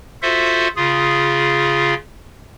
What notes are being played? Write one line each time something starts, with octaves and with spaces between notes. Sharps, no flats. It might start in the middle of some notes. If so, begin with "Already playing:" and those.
F4 F#4 A4 C5 E5
C#3 F4 G#4